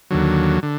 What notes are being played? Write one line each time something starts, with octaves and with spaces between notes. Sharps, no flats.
D#2 D3 F#3
D3